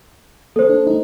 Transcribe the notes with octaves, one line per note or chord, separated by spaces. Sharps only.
A#3 A4 C5
D4
A3 D#4